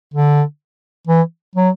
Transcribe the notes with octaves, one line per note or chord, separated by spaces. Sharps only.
D3
E3
F#3